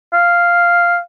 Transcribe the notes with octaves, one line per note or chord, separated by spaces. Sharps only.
F5